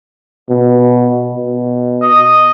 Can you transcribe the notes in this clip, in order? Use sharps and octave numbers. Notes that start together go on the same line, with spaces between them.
B2
B2
D#5